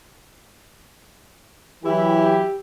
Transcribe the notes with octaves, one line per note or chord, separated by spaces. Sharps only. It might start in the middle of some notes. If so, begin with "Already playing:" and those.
E3 F#3 E4 G4